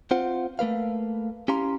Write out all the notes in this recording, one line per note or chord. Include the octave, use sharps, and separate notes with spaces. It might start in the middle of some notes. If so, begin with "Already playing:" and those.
C4 F4 C5 F#5
A3 A#3 B4 F5
C#4 E4 G4 F5 A#5 C6